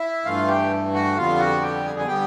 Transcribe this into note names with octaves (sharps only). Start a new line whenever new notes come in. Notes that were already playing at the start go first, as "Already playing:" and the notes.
Already playing: E4 E5
G2 E3 A3 F4 F5
G4 G5
F#4 F#5
F2 D3 G3 B3 F4 F5
F#4 F#5
G4 G5
G#4 G#5
G#5
D3 G3 B3 G4 G5